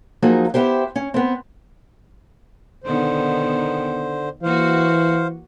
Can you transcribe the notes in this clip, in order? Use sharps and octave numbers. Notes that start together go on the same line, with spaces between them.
F3 F#3 A#3 D#4 G#4
B3 E4 G4 C5
C#4
B3 C4
B2 D3 D#3 B3 C5
E3 A#3 F#4 C5 F5